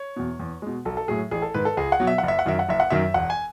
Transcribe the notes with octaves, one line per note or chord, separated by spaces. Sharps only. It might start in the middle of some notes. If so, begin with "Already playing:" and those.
Already playing: C#5
E2 B2
E2
B2 G#3
B1 A4
A4
A2 F#3 G#4
A1 G#4
A4
G#2 D#3 B4
A4
C#2 G#4
F#5
B2 F#3
E5
F#1 F#5
E5
F#5
F#2 D#3 E5
F#5
F#1 E5
F#5
F#2 D#3 F#3 E5
E1 F#5
G#5